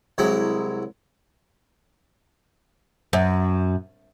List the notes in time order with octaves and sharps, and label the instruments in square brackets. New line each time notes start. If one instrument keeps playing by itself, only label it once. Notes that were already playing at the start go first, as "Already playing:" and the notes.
[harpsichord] C2 F#3 G#3 E4 B5
[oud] F#2